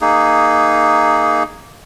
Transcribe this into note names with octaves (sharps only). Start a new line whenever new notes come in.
A#3 D#4 G#4